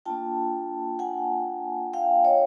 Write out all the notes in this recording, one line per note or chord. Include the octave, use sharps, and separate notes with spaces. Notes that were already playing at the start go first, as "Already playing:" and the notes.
A#3 D4 F4 G5 A5
F#5 G#5
F5 G5
C#5 D#5